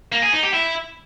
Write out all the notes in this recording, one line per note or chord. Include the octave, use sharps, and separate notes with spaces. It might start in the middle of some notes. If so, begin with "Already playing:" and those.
A#3
G#4
D#4
G4
E4